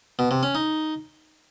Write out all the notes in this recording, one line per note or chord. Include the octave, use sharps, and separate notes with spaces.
B2
C3
C#4
D#4